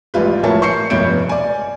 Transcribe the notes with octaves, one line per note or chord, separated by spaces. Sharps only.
A1 G3 F4 B4
A#1 A2 A#4 C#5 A5
C#6 G6 C7 C#7
F1 G2 B2 C#5 G6 D7
D5 G#5